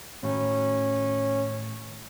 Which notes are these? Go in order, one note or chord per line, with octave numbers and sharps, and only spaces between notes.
A2 D#3 C#4 F#4